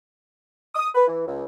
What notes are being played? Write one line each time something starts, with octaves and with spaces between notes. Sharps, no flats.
D#6
B4
E3
C#2